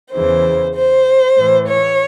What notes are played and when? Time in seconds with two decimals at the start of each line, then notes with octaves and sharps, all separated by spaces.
0.12 E2 C#3 E3 C5
0.75 C5
1.36 A2 E3
1.67 C#5